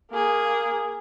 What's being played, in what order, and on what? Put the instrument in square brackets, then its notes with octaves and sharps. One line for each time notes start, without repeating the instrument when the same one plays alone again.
[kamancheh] A#3 G#4